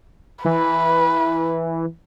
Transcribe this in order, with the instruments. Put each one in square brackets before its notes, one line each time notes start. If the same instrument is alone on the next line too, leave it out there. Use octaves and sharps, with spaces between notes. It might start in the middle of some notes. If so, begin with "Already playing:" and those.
[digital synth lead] E3 [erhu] B4